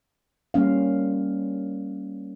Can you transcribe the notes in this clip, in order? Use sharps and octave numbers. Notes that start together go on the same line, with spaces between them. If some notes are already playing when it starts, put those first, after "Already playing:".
G3 A#3 C#4 F5